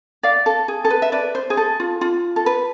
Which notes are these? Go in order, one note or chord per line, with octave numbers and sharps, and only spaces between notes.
D5 F5
A4
G#4
A4
B4
E5
B4 D5
C5
G#4
A4
F4
F4
A4
B4